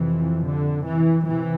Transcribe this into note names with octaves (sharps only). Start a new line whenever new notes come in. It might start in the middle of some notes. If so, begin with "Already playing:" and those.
Already playing: F2 C3 E3
D3
E3
C3 E3